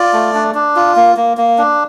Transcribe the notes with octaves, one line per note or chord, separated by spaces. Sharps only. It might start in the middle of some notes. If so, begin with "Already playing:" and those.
Already playing: F4 D5
A3
D4
D4
F4
A#3
A#3
A#3
D4